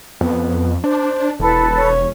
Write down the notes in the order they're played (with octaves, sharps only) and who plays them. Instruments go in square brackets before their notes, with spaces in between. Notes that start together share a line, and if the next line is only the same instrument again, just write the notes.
[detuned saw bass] F2 [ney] B3
[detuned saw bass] D4 [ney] C5
[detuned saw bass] E1 [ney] E4 [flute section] A4 B4
[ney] C#5